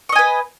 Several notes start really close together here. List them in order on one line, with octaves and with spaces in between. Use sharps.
C#6 D#5 G#5 B4